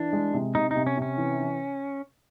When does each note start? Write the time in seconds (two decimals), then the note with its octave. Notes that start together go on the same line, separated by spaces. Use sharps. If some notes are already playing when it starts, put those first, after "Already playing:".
Already playing: E3 D4
0.13 G#3
0.34 C3
0.55 C3 D#4
0.71 C3 D#4
0.87 C#4
0.97 C3 C#4
1.17 E3
1.39 E3